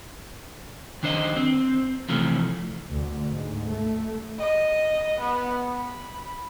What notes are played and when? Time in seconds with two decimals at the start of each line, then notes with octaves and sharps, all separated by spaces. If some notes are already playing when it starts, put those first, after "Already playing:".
1.03 D#3 D4 C5 D#5
1.37 C4
2.09 C3 E3 F3 A3
2.90 D2
3.30 G#2
3.73 A3
4.39 D#5
5.19 B3
5.76 B5